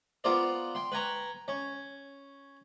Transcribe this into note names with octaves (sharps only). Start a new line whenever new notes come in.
B3 F4 A#4 C5 D5
G5 C6
B4 G5 G#5 A#5 C#6
C#4